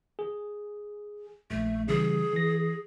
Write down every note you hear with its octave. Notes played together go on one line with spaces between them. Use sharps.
G#4
A#1 A3
C#3 E3 G3 G#4
E3 A#6